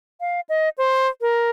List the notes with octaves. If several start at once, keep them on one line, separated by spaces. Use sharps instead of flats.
F5
D#5
C5
A#4